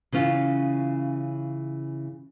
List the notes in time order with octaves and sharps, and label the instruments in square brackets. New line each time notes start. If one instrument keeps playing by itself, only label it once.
[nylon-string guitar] C#3 E3 C#4 F4